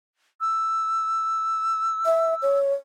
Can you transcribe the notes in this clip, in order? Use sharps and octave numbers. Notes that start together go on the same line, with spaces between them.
E6
E5
C#5